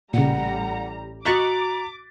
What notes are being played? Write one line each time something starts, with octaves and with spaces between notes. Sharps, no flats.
A1 A#2 C#3 G3 F#5 A#5
F#4 D#5 A#5 C#6 D6 F#6 A6 B6